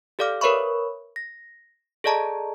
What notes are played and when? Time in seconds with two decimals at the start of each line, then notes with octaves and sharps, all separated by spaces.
0.19 G4 A4 D5 F5 D6 F6
0.41 A#4 B4 C#5 E5 B5 C#6
1.16 A#6
2.04 G#4 A4 D5 D#5 A5 A#5